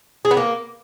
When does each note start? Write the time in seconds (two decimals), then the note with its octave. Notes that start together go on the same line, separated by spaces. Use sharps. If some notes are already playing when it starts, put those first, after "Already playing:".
0.25 G#4
0.31 B3
0.37 A#3